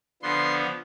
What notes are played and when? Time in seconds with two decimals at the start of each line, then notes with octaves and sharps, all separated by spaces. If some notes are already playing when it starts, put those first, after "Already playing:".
0.22 D3 F3 B3 C6